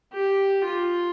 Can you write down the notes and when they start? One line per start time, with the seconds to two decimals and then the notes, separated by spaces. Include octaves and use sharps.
0.14 G4
0.66 F4